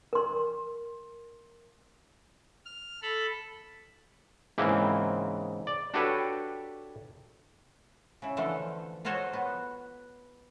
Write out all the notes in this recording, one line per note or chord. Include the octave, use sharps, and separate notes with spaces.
A#4 C6
F6
A4 B5
G#2 C#3 E3 A#3 C4 E4
D5
D4 F#4 G4 A4 B4 C#5
C#3 E4
D3 E3 F3 A3 A4 C5
F4 F#4 A4 C5 C#5 D#5
B3